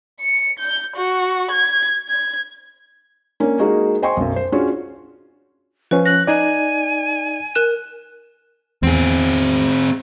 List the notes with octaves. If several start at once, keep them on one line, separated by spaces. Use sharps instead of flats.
C#7
G6
F#4
G#6
G#6
A#3 C#4 D4
G#3 A#3 D#4 F#4 G#4 A#4
C5 D#5 G5 G#5 C6 C#6
B1 F#2
C5
C#4 D4 F4 F#4 G#4 C#5
F3 C#4 B4
F#6 A#6
D#4 D5 G#5
A#4 F#6 E7
E2 C4 G#4